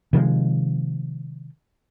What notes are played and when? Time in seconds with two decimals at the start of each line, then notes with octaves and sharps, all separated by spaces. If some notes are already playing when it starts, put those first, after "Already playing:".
0.13 C3 D#3 F3 G#3